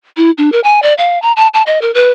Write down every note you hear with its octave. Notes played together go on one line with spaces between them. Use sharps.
E4
D4
A#4
G#5
D5
F5
A#5
A5
A5
D#5
A#4
B4